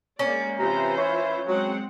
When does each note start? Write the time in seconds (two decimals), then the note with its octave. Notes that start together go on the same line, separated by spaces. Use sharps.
0.19 G#3 A#3 C#4 D5
0.59 C3 E3 F4 C5 A#5
0.98 E4 C#5
1.47 F#3 G#3 C4 F#5